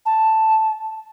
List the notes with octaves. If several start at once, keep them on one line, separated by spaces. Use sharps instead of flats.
A5